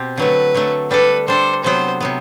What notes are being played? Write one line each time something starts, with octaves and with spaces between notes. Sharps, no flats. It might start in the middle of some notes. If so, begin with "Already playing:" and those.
Already playing: B2 C4 G4
D3 F#3 A3 B4
D3 F#3 A3
G3 D4 A4 B4
G3 D4 A4 C5
C3 F#3 B3 C5
C3 F#3 B3